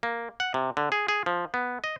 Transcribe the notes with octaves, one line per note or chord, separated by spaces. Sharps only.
A#3
F#5
C3
D3
G#4
G#4
F3
B3
D#5